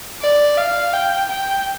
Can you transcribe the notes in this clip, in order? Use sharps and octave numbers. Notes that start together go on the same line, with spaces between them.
D5
F5
G5
G5